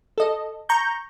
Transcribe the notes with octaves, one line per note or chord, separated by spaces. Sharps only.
A4 D#5
A#5 C#6 G6